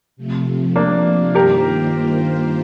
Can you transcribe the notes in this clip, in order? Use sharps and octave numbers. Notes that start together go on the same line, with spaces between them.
C3 F3 A3
A#3 D4
G2 D#3 A#3 F4 G4 A#4 C5